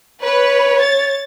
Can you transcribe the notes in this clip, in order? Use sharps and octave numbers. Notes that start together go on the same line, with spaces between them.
B4 C#5
A6